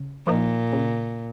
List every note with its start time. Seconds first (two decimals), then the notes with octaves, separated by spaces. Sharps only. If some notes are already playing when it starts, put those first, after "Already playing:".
Already playing: C#3
0.26 A#2 F3 A#3 D#4
0.73 C#3